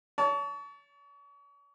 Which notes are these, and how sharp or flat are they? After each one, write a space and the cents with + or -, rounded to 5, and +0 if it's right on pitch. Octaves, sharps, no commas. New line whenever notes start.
C#5 +35 A5 -10 C#6 +0